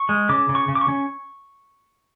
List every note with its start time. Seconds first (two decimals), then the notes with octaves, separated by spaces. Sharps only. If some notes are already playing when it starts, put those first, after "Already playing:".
Already playing: C#6
0.09 G#3
0.29 C#3 D6
0.49 C#3
0.55 C#6
0.68 C#3
0.75 D6
0.81 C#6
0.88 C#4